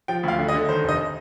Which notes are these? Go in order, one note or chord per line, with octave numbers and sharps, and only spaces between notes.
F3 G5
D2 F5
D3
D#5
D3
D#3 C5
F1 D#5